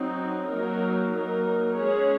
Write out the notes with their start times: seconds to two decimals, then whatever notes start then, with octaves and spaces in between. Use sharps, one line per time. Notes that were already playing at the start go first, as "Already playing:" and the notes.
Already playing: F#3 C4 D#4
0.49 F#3 A#3 D#4 A#4
1.14 F#3 A#3 D#4 A#4
1.77 G#3 C#4 G#4 C#5